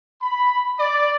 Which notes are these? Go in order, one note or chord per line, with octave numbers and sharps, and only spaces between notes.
B5
D5